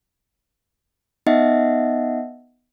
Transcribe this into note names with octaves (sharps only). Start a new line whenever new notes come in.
B3 D#4 D#5 E5 F#5